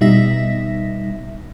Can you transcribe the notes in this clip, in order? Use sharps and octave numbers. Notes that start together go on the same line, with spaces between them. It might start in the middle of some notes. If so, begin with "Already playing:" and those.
B2 G3 D#4 E5 A#6 B6